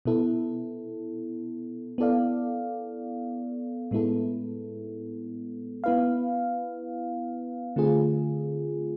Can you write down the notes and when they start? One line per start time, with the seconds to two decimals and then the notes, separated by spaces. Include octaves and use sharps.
0.05 B2 B3 E4 A4
1.98 B3 E4 A4 D5 F5
3.91 A2 G#3 B3 E4 A4
5.84 B3 E4 B4 F5
7.76 D3 A3 C4 F4 G#4